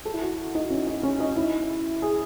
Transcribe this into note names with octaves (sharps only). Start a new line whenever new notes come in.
A4
E4
F#4
D#4
C#4
D#4
C#4
D#4
E4
G#4